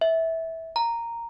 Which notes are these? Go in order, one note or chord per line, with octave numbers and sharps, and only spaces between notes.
E5
A#5